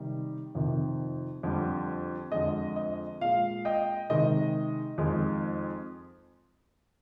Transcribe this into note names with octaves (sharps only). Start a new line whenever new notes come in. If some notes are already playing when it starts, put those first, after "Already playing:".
Already playing: C3 D#3 G3
F2 C3 D#3
F2 D3 G3
F2 D3 G#3 D#5
D#5
A#2 G#3 F5
D#5 G5
C3 D#3 G#3 D#5
F2 D#3 G#3